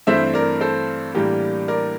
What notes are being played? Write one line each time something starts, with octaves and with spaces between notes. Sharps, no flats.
G2 E3 A3 C4 C5 E5
A#4 D5
A4 C5
A2 E3 G3 A#3 D4 G4 A#4
A#4 D5